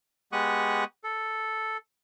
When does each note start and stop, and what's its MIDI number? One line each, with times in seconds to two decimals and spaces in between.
0.32 0.84 56
0.32 0.84 59
0.32 0.84 67
0.32 0.84 85
0.32 0.84 87
0.32 0.84 90
1.04 1.77 69